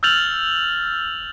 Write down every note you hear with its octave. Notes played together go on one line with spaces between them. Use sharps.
E6 F6 G6 A6 F7 F#7